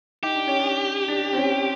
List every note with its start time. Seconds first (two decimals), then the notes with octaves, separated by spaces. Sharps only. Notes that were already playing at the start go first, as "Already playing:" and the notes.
0.23 D#4 G4
0.35 D4
0.47 C#4
0.59 D4
1.08 D4
1.33 C4
1.37 C#4